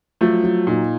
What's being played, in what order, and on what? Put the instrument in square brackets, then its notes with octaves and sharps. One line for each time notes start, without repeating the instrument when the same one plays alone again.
[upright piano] F3 A3 [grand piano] F#3
[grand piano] F#3
[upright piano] A#2 [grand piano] D#4